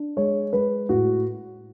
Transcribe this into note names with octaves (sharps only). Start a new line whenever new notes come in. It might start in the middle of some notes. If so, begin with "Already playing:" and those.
Already playing: D4
G#3 C#5
G#3 B4
A2 F#4